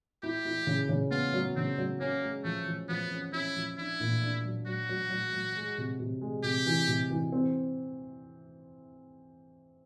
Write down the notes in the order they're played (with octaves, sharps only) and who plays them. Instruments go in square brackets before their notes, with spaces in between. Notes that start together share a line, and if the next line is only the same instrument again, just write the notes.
[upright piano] E4 [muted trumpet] G4
[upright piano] E4
C#3
C#3
[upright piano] B3 [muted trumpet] F4
[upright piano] F#3
[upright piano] C#3 [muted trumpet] C4
[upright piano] F#3
[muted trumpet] A#3 [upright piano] C#4
[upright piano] G#3
[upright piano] F3 [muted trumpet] A3
[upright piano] F3
[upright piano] F3 [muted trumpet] B3
[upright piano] C#4
[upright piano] C#4 [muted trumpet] E4
[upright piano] F3
[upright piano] D4 [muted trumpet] E4
[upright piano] A#2
D4
F#3
[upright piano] F#3 [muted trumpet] F#4
[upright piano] F#3
F#3
F#3
G#3
C3
C3
G#3
[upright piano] C3 [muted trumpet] G4
[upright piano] E3
C3
E3
C4